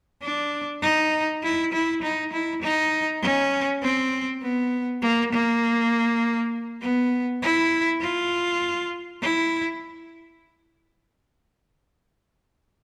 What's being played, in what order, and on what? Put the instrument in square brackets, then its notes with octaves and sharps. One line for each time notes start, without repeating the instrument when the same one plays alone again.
[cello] D4
D#4
E4
E4
D#4
E4
D#4
C#4
C4
B3
A#3
A#3
B3
E4
F4
E4